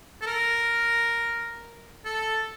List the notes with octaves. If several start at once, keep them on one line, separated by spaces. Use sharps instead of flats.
A4
A#4
A4